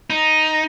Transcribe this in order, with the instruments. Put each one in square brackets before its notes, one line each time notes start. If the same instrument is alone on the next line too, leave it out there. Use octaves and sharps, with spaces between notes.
[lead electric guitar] D#4